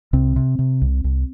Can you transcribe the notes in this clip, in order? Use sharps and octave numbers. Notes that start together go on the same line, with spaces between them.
C2 C3 C4
C3
C3
C2
C2